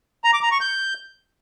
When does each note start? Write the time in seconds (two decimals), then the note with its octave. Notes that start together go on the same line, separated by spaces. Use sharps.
0.24 A#5
0.33 D6
0.43 A#5
0.52 C#6
0.61 G6